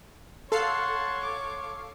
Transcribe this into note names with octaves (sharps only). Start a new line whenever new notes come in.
A4 C#5 F5 F#5 A5 C6 C7
D6